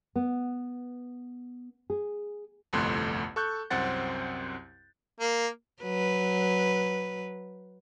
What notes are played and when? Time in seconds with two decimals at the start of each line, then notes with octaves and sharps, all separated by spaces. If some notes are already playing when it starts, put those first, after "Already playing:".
0.16 B3
1.90 G#4
2.73 G1 C2 F2 A3 C6 F#6
3.36 A4 C#6 F#6 G6
3.70 C2 F#2 C4 C5 F#5 A6
5.20 A#3
5.82 F#3 B4